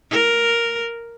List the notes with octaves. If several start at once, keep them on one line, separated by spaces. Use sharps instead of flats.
A#4